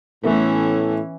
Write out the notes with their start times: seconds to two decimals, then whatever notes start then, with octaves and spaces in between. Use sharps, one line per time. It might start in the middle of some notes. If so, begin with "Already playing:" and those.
0.24 A2 E3 A3 B3 C#4